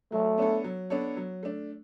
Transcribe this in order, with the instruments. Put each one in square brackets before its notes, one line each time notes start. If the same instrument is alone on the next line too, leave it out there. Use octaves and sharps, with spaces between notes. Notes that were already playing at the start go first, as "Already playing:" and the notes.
[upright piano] F#3 [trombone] A3
[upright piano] B3 D4 A4 C#5
F#3
B3 D4 A4 C#5
F#3
A3 D4